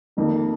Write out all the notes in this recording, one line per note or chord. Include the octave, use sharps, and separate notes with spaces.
F1 F2 D#3 A#3